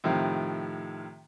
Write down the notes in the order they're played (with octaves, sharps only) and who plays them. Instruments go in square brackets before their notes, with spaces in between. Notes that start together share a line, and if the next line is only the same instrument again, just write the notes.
[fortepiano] A2 C3 D#3 F3